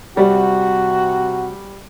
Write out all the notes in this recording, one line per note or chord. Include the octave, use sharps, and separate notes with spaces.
C3 G3 F#4